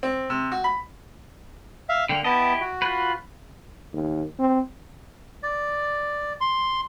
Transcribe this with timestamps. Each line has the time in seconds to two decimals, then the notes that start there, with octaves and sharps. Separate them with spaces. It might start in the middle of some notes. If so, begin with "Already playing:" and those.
0.03 C4
0.30 C3
0.52 F#4
0.64 B5
1.89 E5 F5
2.09 D3 A#3 G5
2.24 B3 E4 G4 D#5 A5
2.61 F#4
2.82 F4 B4
3.93 D#2
4.39 C4
5.43 D5
6.41 C6